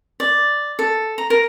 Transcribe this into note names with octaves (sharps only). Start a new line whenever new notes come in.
D5
A4
A#5
A#4